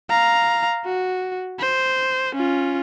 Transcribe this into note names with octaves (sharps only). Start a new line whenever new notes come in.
F5 A#5
F#4
C5
C#4 F4